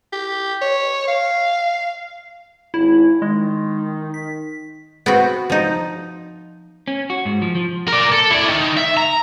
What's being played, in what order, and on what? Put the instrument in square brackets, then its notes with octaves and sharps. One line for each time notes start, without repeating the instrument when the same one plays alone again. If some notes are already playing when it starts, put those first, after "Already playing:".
[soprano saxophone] G4
C#5
F5
[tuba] G#1 [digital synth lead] E4
[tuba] D#3 [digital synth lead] G#3
[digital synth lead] B6
[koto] B3 C4 F#4
F3 D#4
[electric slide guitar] C#4
F#4
G#2
F3
F3
[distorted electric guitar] A#4 D5
A4
E4 D5
D#3
E5
A#5